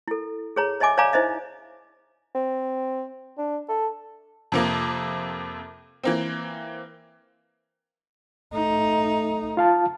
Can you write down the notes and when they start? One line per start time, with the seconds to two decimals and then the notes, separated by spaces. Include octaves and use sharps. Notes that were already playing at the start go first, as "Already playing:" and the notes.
0.08 E4 A4
0.56 G#4 C#5 A#5
0.80 C#5 D#5 E5 G#5 D6
0.97 C#5 D5 F5 G#5 A#5 D6
1.13 D#4 E4 C5 D#5 E5
2.35 C4
3.38 D4
3.69 A4
4.52 F2 C3 A#3
6.04 E3 A#3 C4
8.54 A3 D#4
9.57 F4 F5 A5